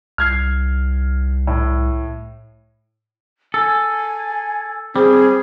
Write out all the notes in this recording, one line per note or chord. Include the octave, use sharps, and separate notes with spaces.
C2 F6 G#6 C7
A2
A4 G#5
G3 C4 G#4